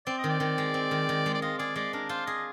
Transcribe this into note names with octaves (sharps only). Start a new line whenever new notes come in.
C4 D5
D#5
D#3
D5
D#3
G#3
C4
D#3
D#3
G#3
D5
F4 D#5
G#4 D5
G#3 D5
D4 A#4
F4 C5
G#4 D#5